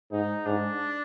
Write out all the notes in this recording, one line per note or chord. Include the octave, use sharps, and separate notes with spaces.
G#2 D#4
G#2 D4